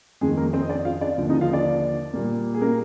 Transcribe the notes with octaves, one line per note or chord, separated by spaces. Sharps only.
F2 D#3 G#3 A#3 G#4
A#3 A#4
C4 C5
D#5
D4 D5
F4 F5
D4 D5
D#2 D3 F3
D#4 D#5
F4 F5
D4 D5
A#2 G3 A#3
G#4
A#3 A#4